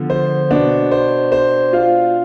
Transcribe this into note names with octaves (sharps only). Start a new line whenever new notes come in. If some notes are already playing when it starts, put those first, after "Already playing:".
Already playing: D3 F3 B3
C5
B2 B3 D4
C5
C5
F4 F5